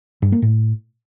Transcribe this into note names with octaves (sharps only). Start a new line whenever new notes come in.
G2
A#3
A2